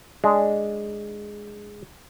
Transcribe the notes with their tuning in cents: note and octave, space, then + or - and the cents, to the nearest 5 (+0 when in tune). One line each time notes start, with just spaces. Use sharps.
G#3 +0 D4 +0